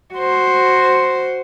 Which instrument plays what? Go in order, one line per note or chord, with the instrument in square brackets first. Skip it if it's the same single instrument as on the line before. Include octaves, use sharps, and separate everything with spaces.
[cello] F#4 C5